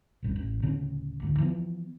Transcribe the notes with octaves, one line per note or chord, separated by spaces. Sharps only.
D#1 A1 G2
A1
D1 C#3 C#4
D2 G#2
E3 F3 B3